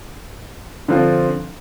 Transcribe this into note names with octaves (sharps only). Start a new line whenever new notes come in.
D3 F3 C4 F4